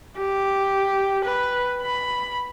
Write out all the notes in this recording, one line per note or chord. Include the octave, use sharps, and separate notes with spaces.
G4
B4
B5